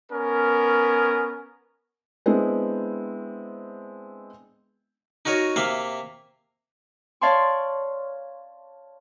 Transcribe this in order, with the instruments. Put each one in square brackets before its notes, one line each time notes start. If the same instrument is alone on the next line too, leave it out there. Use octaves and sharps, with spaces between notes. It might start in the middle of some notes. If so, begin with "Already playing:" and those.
[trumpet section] B3 C#4 A#4
[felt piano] G#3 B3 C4 D4 E4
[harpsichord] D#4 F#4 A#4 C#5 D#5
C3 A#3 E5 F5
[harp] C#5 D5 F5 A5 C6 C#6